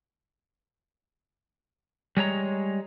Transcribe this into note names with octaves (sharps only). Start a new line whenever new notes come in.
G3 G#3 C#5 A#5